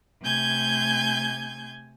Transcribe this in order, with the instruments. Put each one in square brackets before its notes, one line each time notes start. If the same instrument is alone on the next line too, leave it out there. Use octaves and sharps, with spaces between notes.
[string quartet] C3 A3 G#5 G6 G#6